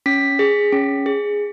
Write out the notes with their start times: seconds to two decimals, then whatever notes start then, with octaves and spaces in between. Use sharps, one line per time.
0.06 C#4 B6
0.39 G#4
0.73 C#4
1.06 G#4